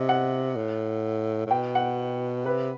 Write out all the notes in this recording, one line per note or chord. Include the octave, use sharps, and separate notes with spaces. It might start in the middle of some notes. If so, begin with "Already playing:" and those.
Already playing: C3 D#5
F#5
A2
A2
B2 G5
F#5
C3 B4